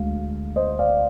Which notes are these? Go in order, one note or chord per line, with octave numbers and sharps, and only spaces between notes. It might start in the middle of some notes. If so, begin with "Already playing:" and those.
Already playing: D2 D3 G#3 F5
C5 D#5
D5 F5